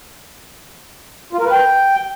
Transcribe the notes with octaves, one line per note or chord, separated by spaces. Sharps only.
F4
A#4
B4
G5